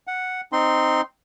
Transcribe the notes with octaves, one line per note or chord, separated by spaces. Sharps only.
F#5
C4 D#4 C6